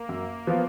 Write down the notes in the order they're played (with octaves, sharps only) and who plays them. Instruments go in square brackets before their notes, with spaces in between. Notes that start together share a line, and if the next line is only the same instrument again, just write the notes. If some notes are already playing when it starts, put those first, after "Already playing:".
Already playing: [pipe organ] A#3
[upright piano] F#2
F3 B3 F4